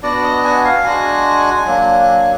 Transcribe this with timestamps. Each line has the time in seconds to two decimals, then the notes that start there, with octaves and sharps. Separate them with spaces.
0.02 B3 D4 F#4 D5
0.24 D#5
0.44 G#5
0.65 F5
0.84 G#3 D4 F#4 G#5
1.66 F#3 A#3 D4